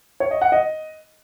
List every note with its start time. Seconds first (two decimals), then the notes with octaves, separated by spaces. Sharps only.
0.20 C#5
0.31 D#5
0.42 F#5
0.52 D#5